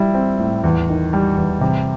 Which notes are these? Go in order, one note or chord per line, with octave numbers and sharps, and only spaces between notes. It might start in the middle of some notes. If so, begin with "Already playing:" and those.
Already playing: G3 E4
C4
A2
E2
D#3
G3
E2
C3